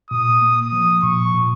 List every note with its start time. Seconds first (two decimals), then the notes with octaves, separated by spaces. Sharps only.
0.11 A#2 D#6
0.42 A#3
0.57 D#6
0.72 F3
1.03 A#2 C#6
1.34 A#2